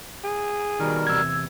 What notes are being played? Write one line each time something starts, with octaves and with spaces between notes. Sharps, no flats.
G#4
B2 D#3 G3 A#4
E2 A2 C3 E6 G#6